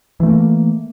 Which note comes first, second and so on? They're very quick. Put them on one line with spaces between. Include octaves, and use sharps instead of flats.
E3 A3 C#4 A#3